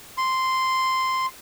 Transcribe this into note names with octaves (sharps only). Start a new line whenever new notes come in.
C6